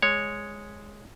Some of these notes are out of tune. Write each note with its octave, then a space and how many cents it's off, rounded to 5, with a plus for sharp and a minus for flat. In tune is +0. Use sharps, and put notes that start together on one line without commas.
G#3 +0 C#5 +0